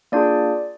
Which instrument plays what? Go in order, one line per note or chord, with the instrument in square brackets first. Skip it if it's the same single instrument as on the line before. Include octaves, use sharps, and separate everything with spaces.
[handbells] A#3 D4 F4 G#4 D5